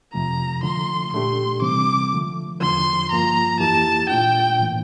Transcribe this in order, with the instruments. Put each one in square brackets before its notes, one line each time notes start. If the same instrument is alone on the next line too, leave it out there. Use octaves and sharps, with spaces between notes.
[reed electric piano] F2 C3 F3 A3 [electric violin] A#5
[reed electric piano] D3 F3 A3 [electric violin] C6
[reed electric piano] A#2 A3 D4 G4 [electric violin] C6
[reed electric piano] C3 E3 G3 C4 [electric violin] D6
[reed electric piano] D3 F3 A3
[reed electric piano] E2 D3 F3 [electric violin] C6
[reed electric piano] G2 F3 A#3 F4 [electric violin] A#5
[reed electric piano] F2 E3 A#3 E4 G4 [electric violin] A5
[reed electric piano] A#2 A3 D4 F4 [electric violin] G5
[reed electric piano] A2 E3 A#3